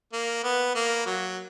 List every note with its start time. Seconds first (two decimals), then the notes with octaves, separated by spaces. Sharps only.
0.13 A#3
0.44 B3
0.75 A#3
1.06 F#3